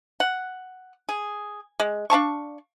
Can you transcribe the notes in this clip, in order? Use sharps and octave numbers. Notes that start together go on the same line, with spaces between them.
F#5
G#4
G#3
D4 F5 A5 C#6